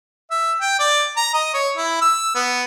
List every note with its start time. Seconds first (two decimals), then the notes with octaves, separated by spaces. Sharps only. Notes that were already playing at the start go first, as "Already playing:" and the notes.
0.31 E5
0.61 G5
0.79 D5
1.16 A#5
1.34 D#5
1.54 C#5
1.77 E4
2.01 E6
2.35 B3